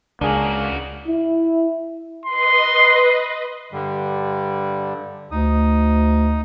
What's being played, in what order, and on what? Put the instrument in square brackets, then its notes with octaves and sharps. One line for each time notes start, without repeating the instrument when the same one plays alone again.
[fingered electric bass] C#2 [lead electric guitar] C#3 F#4 [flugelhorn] A#3 [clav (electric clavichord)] D4 G#4
[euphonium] E4
[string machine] B4 D#5 [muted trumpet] C6
[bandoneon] G2 D3 G3
[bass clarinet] D2 [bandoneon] D#4 D#6